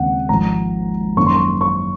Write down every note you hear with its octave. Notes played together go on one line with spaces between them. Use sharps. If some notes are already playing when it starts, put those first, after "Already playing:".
Already playing: D#2 C#3 G#3 C4 F#5
G#1 G#2 F3 A#5
F#2 D#3 A#3 C#4 C#6
C6
C#6
C#6